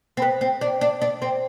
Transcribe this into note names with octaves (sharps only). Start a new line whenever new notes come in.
C4
B3
C4
D4
D4
D4
C4